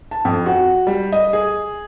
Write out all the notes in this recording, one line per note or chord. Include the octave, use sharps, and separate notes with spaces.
A5
F2
F#4
G3
D#5
G#4